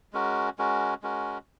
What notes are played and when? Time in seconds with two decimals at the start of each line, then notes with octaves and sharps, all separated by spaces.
0.13 G#3 C#4 F#4 A#4
0.58 G#3 C#4 F#4 A#4
1.02 G#3 C#4 F#4 A#4